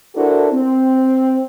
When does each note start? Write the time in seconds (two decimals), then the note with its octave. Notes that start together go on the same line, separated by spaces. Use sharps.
0.15 D4 E4 F#4 A4 A#4 C5
0.52 C4